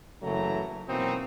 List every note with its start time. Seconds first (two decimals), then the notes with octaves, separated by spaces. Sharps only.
0.23 F#1 C#3 E3 F#3 A3 A#5
0.88 B2 E3 F#3 A#3 C4 D#4